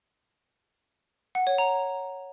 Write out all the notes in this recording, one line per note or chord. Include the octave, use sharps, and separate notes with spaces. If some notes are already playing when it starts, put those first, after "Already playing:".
F#5
C#5
A#5